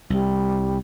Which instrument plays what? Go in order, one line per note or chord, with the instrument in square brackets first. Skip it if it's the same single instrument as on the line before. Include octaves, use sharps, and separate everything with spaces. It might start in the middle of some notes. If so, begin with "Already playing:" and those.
[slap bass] C2 [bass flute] G3